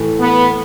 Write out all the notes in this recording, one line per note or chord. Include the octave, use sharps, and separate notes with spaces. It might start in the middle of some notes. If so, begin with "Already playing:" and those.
Already playing: A2 E3 A3
B3